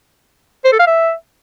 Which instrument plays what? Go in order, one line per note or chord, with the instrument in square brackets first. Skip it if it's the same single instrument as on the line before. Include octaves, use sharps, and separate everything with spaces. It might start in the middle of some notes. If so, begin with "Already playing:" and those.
[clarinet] C5
A4
F5
E5